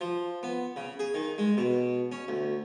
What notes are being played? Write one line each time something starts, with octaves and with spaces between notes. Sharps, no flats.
F3
B3
C#3
G#4
D#3
G#3
B2
C#4
D2